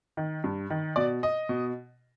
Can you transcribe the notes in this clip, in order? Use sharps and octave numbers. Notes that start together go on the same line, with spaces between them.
D#3
G2
D#3
B2 D5
D#5
B2